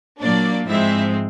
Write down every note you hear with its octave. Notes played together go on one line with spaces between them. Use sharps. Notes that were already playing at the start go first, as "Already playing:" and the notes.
A#2 F#3 A#3 D4 D5
G#2 F3 G#3 C4 E4 E5